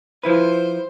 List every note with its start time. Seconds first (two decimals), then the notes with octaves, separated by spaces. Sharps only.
0.23 F3 E4 B4 C5